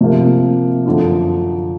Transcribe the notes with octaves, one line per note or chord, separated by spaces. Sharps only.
C3 F3 A#3
F#2 D3 F3